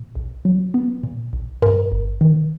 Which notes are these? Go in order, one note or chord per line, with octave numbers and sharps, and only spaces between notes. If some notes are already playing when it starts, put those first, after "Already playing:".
Already playing: A#2
B1
F#3
B3
A#2
B1
G2 A#4
G1
D#3